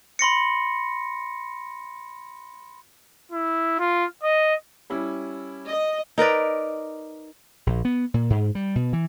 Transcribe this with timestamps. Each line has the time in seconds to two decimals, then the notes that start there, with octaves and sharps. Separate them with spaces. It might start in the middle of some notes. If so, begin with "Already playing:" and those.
0.19 B5 C6 A#6 C#7
3.31 E4
3.79 F4
4.23 D#5
4.90 G3 C#4 E4
5.67 D#5
6.18 D#4 A#4 B4 D5
7.67 A#1
7.85 B3
8.14 A#2
8.30 G#2
8.55 G3
8.75 B2
8.93 E3